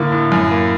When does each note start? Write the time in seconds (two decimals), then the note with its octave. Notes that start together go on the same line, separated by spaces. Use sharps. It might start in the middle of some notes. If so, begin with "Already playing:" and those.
Already playing: A2 D3 A#3
0.12 A2
0.32 F#2
0.51 A#3